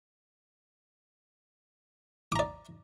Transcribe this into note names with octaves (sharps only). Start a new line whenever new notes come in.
D5 A#5 D6